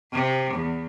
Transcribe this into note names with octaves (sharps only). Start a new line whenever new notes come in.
C3
E2